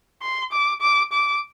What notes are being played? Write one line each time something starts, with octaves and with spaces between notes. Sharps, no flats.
C6
D6
D6
D6